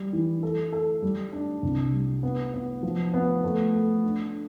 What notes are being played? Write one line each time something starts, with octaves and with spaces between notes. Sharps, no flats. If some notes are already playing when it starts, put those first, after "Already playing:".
Already playing: G3
E3
A4
A4
G3
D4
C2
G3
B3
B3
F3
B3
A3
A4
D4